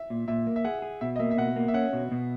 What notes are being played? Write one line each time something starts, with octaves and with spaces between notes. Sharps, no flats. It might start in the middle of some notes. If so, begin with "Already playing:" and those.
Already playing: E5
A#2
A#2 E5
A#3
E5
G#4 F#5
G#4
B2 E5
D#5
A#3 E5
E5
B2 F#5
A#3
E5
C#4 F#5
B2
B2